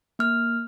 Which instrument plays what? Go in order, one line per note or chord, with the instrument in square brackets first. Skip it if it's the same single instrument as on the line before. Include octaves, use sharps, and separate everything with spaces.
[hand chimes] A#3 F6